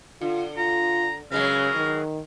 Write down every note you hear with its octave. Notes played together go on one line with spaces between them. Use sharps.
D3 F4
F4 A#5
C#3 F#3 G#3 A#4 B4
D#3